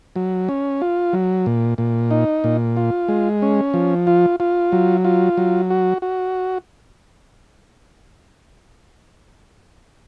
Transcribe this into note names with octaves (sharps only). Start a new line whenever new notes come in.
F#3
C#4
F4
F#3
A#2
A#2
D#4
A#2
F4
G#3
C#4
F3
F4
F4
F#3
F4
F#3
F#4
F#4